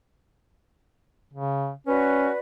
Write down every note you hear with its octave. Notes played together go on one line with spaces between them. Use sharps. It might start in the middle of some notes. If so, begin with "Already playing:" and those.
C#3
C#4 F#4 B4 D5